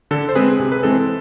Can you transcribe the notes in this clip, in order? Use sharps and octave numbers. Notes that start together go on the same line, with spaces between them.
D3 A4
C5
G#3 C4 G#4 B4
C3 G#4
B4
E3 G#3 C4 A4